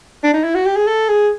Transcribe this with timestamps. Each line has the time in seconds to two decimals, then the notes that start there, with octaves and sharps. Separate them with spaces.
0.24 D4
0.34 D#4
0.44 E4
0.55 F#4
0.65 G4
0.76 G#4
0.87 A4
1.09 G#4